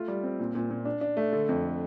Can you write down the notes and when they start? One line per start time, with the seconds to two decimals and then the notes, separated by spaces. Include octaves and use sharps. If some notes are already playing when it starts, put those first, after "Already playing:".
Already playing: A3 F4
0.08 G3
0.23 C4
0.40 A#2
0.55 A#2
0.71 A#2
0.85 D4
1.01 D4
1.17 A3
1.33 D3
1.49 F2